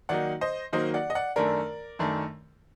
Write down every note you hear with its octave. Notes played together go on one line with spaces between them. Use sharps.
D#3 F#3 A#3 D#4 D5 F#5
C5 D#5
D#3 F#3 A#3 D#4 C5 D#5
D5 F#5
D#5
D5 F#5
F#2 D#3 A3 D4 A#4 D5
F#2 D#3 A3 D4